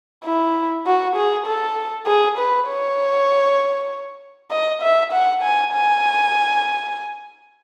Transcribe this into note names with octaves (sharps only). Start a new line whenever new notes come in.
E4
F#4
G#4
A4
G#4
B4
C#5
D#5
E5
F#5
G#5
G#5